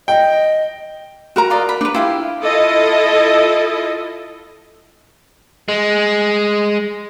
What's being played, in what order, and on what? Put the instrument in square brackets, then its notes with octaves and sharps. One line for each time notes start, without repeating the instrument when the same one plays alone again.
[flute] D#5 [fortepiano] G5
[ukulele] F#4 A#4 A#5
[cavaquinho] F4 D5 D#5
B5
[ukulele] D4 B4
[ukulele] E4 [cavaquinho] F4 G4 F5
[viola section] E4 F4 A4 D#5
[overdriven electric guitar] G#3